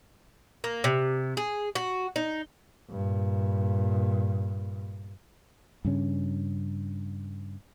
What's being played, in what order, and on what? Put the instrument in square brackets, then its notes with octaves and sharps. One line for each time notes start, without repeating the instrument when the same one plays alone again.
[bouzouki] A#3
C3
G#4
F#4
D#4
[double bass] G2 A#2
[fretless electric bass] G2 C#3 C#4